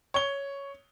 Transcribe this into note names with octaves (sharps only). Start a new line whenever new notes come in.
C#5 G7